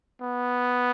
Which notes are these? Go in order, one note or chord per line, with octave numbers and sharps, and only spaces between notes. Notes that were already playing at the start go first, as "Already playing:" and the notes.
B3